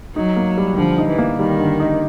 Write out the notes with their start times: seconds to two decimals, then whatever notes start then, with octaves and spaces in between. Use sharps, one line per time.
0.16 F#3 D#4
0.36 A#3
0.57 G3
0.77 D3 F3
0.98 D#4
1.09 E3
1.18 A#3
1.39 D#3 G3
1.59 D3
1.80 D#4